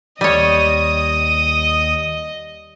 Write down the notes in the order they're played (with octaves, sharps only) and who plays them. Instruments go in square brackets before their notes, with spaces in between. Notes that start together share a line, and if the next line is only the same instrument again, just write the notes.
[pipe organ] D#2 D#6 [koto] G3 C#5 [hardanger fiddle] D#5